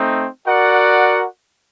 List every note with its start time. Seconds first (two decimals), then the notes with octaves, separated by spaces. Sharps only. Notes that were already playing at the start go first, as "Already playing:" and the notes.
Already playing: A3 C4 D#4
0.47 F#4 A#4 D5 F#5